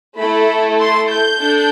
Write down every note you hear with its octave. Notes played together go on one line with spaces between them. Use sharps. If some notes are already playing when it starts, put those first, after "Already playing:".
A3 E4 A4 B5
C6
G6
D4 A4